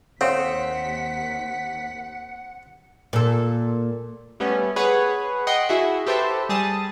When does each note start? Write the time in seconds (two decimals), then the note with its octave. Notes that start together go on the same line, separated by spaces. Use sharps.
0.21 D#2 C4 A4 C#5 F5 F#5 B6
3.13 A#2 A4
4.40 G3 A3 B3 C#4
4.76 G#4 B4 C#5 F#5
5.47 D#5 F#5 G5 C6
5.69 E4 F#4 G#4 E5
6.07 G4 A4 B4 C5 E5 A5
6.49 G3 G#4 A5 D#6 A6